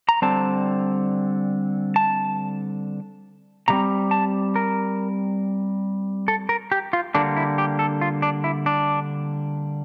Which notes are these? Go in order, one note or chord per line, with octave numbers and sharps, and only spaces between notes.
A#5
D3 G3 C4 A5
A5
C3 G3 C4 A#5
A5
A#4
A4
A#4
G4
F4
D3 G3 A#3 D4
E4
G4
A4
F4
D4
E4
D4